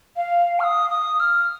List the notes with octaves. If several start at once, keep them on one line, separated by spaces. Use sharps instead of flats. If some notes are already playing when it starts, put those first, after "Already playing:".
F5
F6
D#6
D#6
F6